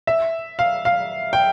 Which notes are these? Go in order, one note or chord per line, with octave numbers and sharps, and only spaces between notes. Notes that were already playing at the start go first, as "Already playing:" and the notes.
E5
F5
F5
G5